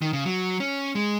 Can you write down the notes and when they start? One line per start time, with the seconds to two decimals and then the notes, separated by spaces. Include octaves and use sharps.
0.02 D#3
0.13 C#3
0.25 F#3
0.60 C#4
0.95 G#3